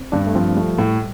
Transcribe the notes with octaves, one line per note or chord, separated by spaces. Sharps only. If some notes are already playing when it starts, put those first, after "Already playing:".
Already playing: C4
G2 D4
A3
F3 C4
G3 A3
A2